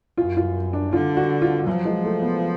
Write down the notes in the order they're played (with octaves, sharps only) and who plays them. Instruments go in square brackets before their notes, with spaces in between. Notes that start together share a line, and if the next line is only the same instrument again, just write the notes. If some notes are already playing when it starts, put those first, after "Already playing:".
[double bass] F#2 [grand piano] F4
[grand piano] F4
D4
[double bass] D3 [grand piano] F4
[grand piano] F#4
F4
[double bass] F3 [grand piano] F#3
[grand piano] G#3
A3
B3